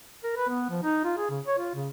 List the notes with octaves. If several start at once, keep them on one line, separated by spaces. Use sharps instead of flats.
A#4
B4
B3
F3
D#4
F4
G#4
C#3
C#5
F4
C#3